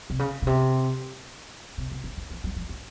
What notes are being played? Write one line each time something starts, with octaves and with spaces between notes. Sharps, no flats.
C3
C#3
B2
C3
C3
C3
D3
E3
F3
F#3
F3
E3